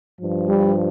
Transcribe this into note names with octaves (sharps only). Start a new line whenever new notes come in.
G2 F3
G3